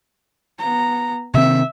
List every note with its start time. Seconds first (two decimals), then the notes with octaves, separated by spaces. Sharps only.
0.59 B3 A#5
1.34 C3 D#3 C4 E5